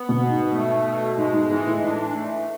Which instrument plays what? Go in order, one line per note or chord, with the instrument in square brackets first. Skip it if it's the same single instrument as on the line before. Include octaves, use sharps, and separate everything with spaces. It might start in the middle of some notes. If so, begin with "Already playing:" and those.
Already playing: [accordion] B3
[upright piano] B2
[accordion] B2
[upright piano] G#2
[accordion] A3
B2
[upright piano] G#2 [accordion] G#3
[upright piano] G#2
[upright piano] G#2 [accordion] E3
[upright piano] A2
[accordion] D4
A3